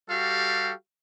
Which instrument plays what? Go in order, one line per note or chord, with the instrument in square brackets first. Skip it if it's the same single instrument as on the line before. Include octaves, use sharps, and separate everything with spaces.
[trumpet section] G3 F#4 G4 A4 F5